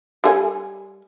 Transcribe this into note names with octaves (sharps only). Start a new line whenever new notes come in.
G3 G#4 G#5